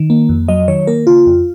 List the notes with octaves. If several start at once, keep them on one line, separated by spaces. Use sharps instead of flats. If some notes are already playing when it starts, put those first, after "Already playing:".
Already playing: D#3
A#3
F2
F#3 D#5
D#3 C#5
A#3 A#4
C#3 F4
F2